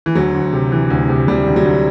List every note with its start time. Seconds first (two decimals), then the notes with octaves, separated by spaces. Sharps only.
0.06 E3
0.15 D2 F#3
0.34 D2
0.53 C3
0.72 E3
0.90 D2
1.09 C3
1.28 C3 G3
1.47 D2
1.56 F#3
1.66 D2